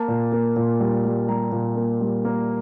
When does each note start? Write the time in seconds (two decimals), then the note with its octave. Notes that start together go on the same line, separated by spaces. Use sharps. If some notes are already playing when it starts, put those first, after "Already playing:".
Already playing: A#3 A5
0.08 A#2
0.32 A#3
0.56 A#2
0.80 G3
1.04 G3
1.29 G3 A#5
1.52 A#2
1.76 A#3
2.01 G3
2.25 A#3